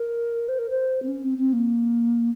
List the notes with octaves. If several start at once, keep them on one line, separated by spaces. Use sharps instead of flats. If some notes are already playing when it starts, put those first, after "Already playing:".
Already playing: A#4
C5
A#4
C5
C4
C#4
C4
C4
A#3